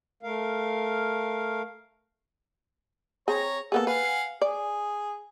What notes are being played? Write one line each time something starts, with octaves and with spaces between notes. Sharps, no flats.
A3 A#4 F5
C4 G#4 C#5 A#5
A#3 B3 G#4 A4
B4 F5 F#5 G#5
G#4 D5